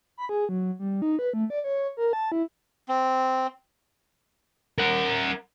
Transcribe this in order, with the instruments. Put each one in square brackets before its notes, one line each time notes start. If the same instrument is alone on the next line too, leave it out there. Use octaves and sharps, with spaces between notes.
[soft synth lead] B5
G#4
F#3
G3
D#4
B4
A3
D5
C#5
A#4
A5
E4
[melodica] C4
[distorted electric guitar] A#4 F#5